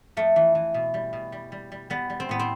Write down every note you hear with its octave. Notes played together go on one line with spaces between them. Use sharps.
F2 A3
E3
E3
B2
G3
B2
G3
G3
G3
G3 B3
G3
C4
A2 B3
C4